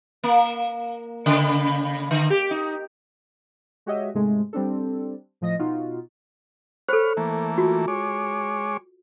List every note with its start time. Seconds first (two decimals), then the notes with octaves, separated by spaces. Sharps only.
0.24 A#3
1.26 C#3
2.11 D3
2.30 G4
2.51 D#4
3.86 G#3 F#4 G4 C#5 D#5 E5
4.14 G#2 C3 G#3 A3
4.53 G3 C4 D4 A4
5.41 A2 F3 D#5 A#6
5.59 B2 D#4 F4 F#4
6.89 A4 C5 C#5 B5 F6
7.17 E3 A3 A#3
7.58 F4 F#4
7.88 G#3 C#5 D6